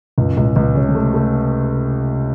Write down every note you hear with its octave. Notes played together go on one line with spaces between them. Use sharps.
C#2 F#2
C#2 A2
C#2 A#2
C3 C#4
C#3
C3 A3
A3